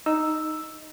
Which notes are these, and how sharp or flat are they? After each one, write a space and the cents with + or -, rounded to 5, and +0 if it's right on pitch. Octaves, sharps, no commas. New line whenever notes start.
D#4 +0 E6 +0